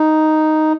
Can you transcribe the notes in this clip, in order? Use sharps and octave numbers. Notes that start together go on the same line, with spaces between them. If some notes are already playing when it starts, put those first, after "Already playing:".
Already playing: D#4